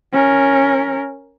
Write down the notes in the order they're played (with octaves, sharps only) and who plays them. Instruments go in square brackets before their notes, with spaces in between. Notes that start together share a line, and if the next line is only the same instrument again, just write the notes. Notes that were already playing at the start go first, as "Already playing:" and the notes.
[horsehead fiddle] C#4 A#4